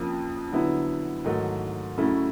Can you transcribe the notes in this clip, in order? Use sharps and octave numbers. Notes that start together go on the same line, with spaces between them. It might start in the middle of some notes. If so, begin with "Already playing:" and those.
Already playing: F2 C#3 F3 A#3
D3 F#3 B3 E4
G#2 D#3 F#3 A3
C#3 F#3 A3 C#4 E4